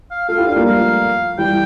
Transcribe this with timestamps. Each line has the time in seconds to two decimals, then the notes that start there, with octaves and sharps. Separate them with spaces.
0.11 F5
0.29 F4 A4 F5
0.38 E4 G4
0.47 D4 F4 F5
0.56 G3 A#3
0.65 F3 A3 F5
1.38 E3 G3 G5